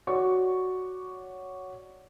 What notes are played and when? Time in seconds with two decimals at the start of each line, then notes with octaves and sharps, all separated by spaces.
0.07 F#4 C#5 D5 C#6